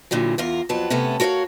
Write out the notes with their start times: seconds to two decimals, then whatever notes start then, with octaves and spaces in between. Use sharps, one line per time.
0.11 G2 A#2 D3 E3 F#3
0.38 E2 F4 A#4
0.69 F2 F#3 B3 A5
0.90 C3 A3 B3 C#4 A4
1.20 F#4 A#4 C#5 E5 F5